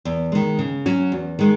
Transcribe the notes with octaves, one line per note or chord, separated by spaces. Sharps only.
E2
D#3 G#3
C#3
F#3 C#4 F#4
E2
D#3 G#3